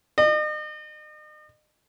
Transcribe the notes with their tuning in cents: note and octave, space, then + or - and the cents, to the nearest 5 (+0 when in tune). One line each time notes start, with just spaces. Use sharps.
D#5 -40